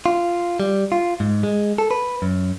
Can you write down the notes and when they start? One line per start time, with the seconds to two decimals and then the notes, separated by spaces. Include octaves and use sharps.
0.06 F4
0.60 G3
0.92 F4
1.20 G#2
1.43 G#3
1.78 A4
1.91 B4
2.22 F#2